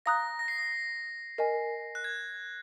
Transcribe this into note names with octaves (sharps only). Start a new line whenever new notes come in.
F5 A#5 D#6 F#6 A#6
A#6
C7
A#6
A#4 D#5 G#5
F#6
G#6